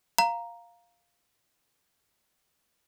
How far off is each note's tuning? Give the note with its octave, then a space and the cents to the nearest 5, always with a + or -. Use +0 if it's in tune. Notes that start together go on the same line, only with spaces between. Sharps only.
F5 +0 A#5 +0